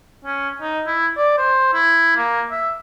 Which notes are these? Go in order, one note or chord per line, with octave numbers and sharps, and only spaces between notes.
C#4
D#4
E4
D5
C5
E4
A#3
E5